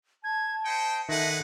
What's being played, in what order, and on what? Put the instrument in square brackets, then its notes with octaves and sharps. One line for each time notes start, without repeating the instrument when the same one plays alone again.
[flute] A5 [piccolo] G#6
[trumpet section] C5 D#5 G5 [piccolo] C#7
[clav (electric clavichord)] D#3 A4 [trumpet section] G#4 B4 F#5 [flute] E5 [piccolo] A#6